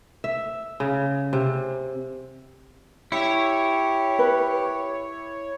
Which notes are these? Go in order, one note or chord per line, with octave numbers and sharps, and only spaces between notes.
E5
C#3
C3
E4 G4 C#5
B4